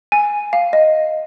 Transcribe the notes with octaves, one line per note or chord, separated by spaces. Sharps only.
G#5
F5
D#5